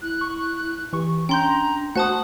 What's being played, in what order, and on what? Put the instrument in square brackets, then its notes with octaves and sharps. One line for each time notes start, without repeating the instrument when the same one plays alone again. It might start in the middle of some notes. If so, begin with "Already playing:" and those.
[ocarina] E4 [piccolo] F#6
[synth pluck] C#6
[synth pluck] E3 C#6 [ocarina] G4
[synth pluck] C#4 [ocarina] D4 [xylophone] G5 C6 G6 [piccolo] A#5
[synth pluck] A3 F#4 C5 [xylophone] F#5 A5 D#6 [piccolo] F#6